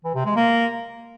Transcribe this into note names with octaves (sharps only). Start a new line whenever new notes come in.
E3
C3
G#3
A#3